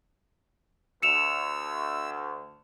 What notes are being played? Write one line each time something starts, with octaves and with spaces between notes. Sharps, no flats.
D2 E6 C#7 E7 F7